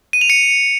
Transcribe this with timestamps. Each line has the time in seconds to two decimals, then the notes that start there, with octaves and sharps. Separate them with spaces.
0.13 D#7
0.21 F7
0.30 C#7